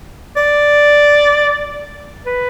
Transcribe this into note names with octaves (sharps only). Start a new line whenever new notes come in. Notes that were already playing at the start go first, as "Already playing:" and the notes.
D5
B4